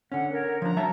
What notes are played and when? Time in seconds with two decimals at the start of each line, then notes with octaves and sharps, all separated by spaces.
0.12 D3 C#4 F#5
0.31 A#4 C#5
0.62 F3 D4 A#5
0.77 F#3 E5 A5